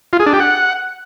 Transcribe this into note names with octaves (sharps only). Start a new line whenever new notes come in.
F4
G#4
D4
G4
F#5